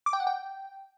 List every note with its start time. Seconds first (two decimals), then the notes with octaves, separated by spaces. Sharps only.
0.06 D6
0.13 G5
0.20 F#5
0.27 G5